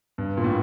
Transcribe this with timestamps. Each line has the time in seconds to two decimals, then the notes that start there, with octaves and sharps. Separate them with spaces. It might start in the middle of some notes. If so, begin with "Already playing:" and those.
0.18 G2
0.37 A#2
0.44 A2